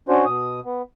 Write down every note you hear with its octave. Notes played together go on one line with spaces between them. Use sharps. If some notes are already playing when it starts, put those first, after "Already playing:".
C#4 D4 F#4 C5
B2 D#6
B3